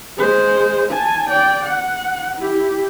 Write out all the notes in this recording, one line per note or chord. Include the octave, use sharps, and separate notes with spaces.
G#3 C5
G#5 A5
D5 G5
F#5
E4 G4